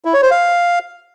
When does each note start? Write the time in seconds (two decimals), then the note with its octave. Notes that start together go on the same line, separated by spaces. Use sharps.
0.05 E4
0.14 C#5
0.22 C5
0.31 F5